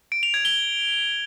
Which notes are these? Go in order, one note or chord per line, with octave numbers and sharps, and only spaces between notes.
D7
F7
G#6
G7